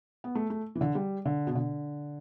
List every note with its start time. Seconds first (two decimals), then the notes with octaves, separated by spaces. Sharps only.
0.24 B3
0.35 A3
0.50 A3
0.75 E3
0.81 D3
0.95 G3
1.25 D3
1.47 B2
1.55 D3